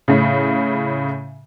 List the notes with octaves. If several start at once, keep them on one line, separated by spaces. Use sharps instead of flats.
A2 C#3